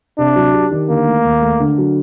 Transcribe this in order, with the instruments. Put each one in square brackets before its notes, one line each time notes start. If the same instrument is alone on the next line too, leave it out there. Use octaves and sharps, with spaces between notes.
[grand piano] C3 [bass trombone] D4
[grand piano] F#3
G4
D#3
[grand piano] D3 [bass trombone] A#3
[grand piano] A3
D#2
A3
D3
F#3